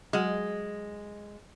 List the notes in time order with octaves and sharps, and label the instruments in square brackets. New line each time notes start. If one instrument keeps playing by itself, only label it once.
[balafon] F#3 F#4 F#5 [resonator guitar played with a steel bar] G#3